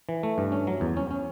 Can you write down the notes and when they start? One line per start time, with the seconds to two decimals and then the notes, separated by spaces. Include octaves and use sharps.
0.09 E3
0.23 A3
0.38 G2
0.52 C#4
0.67 F#3
0.81 E2
0.97 C#4
1.11 C#4